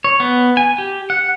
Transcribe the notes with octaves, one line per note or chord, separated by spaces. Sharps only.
C#5
B3
G#5
G4
F#5